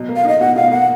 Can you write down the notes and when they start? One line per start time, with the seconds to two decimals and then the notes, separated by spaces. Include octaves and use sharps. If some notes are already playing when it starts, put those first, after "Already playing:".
Already playing: B2 F#3
0.09 A#3
0.16 F5
0.25 D#4 D#5
0.40 B2 F#5
0.56 B2 F5
0.71 A#3 F#5